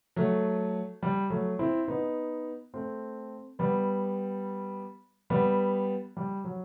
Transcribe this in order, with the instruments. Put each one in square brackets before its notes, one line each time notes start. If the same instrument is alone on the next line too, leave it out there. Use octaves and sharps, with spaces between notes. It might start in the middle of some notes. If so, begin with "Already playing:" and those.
[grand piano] F#3 A3
G3
F#3 A3
C4 E4
B3 D#4
A3 C4
G3 B3
G3 B3
G3
F#3